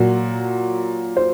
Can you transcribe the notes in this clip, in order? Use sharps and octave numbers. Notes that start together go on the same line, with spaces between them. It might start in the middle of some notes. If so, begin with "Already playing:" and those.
Already playing: A#2 F#3 F#4
C5